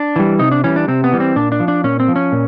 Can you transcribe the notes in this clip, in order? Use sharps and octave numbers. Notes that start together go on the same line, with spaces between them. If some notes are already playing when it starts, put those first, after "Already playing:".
Already playing: D4
E3 G3
C3 D#4
D4
E3 G3 C#4
D4
C3 C4
B3
E3 G3
C4
A#2 D4
D4
F3
D4
A#2 C#4
C4
F3
C#4
A#2